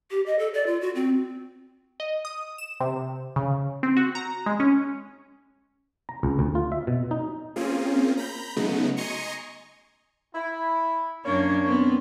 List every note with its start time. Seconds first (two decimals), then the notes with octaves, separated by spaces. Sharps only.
0.11 G4
0.26 D#5
0.39 A4
0.54 D5
0.67 F4
0.81 F#4
0.95 C4
2.00 D#5
2.25 D#6
2.58 E7
2.80 C3
3.36 C#3
3.83 C4
3.97 F#4
4.15 A#5
4.46 G#3
4.60 C#4
6.09 A#5
6.23 C#2
6.39 D2
6.55 F4
6.72 E5
6.87 B2
7.11 D#4
7.56 A#3 C4 C#4 F4 G#4
8.17 A#5 B5 G6
8.56 C#3 F#3 G#3 A3 B3 D#4
8.97 D#5 G#5 A#5 C6 C#6 C#7
10.34 E4
11.25 F#2 A#3 D4 C#5
11.67 B3 C4